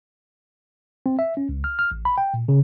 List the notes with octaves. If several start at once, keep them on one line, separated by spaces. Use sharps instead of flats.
C4
E5
C#4
C#2
F6
F6
A1
B5
G5
A#2
C#3